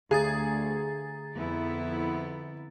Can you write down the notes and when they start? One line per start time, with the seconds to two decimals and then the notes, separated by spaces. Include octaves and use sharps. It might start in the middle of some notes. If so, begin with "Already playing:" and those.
0.11 D2 D3 G#4 A#5 A6
1.35 F2 B3 E4